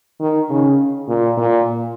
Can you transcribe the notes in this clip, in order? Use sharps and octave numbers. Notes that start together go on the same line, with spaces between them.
D#3
C#3
A#2
A#2